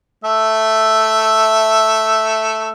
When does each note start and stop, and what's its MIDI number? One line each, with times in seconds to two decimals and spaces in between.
0.24 2.72 57
0.24 2.72 76